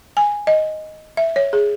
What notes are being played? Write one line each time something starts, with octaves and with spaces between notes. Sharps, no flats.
G#5
D#5
E5
C#5
G#4